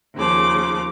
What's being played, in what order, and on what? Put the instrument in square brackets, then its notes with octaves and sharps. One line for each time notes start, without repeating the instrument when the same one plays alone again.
[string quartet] D#2 C#3 F3 D6